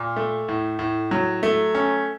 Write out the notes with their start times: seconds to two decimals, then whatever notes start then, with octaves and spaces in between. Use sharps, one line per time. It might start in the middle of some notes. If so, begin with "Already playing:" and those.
Already playing: A#2
0.16 A3
0.48 A2
0.79 A2
1.11 F#3
1.43 A3
1.75 C#4